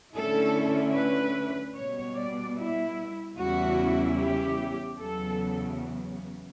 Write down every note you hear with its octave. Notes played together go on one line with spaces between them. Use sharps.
D3 A3 C#4 E4 A4
B4
B2 G3 B3 C#5
D5
E4
E2 C#3 G3 C#4 E4 F#4
G4
E2 C#3 F#3 B3 A4